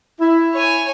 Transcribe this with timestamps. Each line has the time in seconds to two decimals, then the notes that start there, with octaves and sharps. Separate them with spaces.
0.20 E4
0.54 C#5 G#5